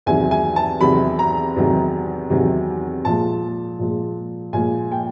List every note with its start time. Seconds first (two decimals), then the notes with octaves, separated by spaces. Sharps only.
0.06 E2 C3 D#3 F#3 G#5
0.31 G#5
0.56 A5
0.81 E2 C3 D#3 F#3 B5
1.19 A#5
1.56 E2 C3 D#3 F#3
2.30 E2 C3 D#3 F#3
3.05 A#2 F3 G#3 A5
3.79 A#2 F3 G#3
4.53 A#2 F3 G#3 G#5
4.92 G5